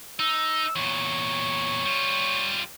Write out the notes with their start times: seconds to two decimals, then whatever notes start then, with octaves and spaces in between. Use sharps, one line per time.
0.19 D#4 E6
0.76 E2 A#2 C#5
1.85 G3 F4